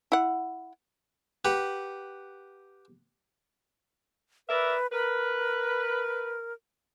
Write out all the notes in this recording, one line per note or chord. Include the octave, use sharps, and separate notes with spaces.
E4 F#5
G4 B4 F#5
A#4 B4 D5 E5
A#4 B4